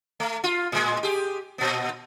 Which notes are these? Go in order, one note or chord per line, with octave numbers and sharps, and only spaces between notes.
A3
F4
A2 G#3
G4 G#4
A#2 B3